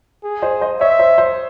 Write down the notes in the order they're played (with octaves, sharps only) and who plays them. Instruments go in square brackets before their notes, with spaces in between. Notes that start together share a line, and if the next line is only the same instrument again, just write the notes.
[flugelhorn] G#4
[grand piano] C5 D#5
C5 D#5
[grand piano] C#5 [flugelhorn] E5
[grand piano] C5
C5